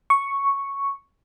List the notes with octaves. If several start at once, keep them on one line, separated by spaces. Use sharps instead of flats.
C#6